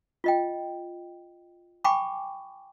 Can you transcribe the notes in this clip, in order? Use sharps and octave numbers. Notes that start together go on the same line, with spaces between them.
F4 D#5 G5
G5 G#5 B5 C#6 D6